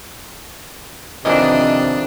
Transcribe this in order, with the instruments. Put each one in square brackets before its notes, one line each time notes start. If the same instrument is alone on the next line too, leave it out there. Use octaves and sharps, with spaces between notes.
[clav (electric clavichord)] F2 D#3 E3 [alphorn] C3 [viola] D4 [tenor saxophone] D#5